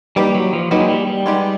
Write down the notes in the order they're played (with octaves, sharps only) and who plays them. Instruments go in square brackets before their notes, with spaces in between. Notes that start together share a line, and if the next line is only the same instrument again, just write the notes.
[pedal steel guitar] G3 [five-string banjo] A#3 D#4 G4 B4
[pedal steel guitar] F#3
F3
[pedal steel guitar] F#3 [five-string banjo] A#3 D#4 G4 B4
[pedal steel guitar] G#3
G3
G3
[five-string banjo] G#3 B3 D#4 G4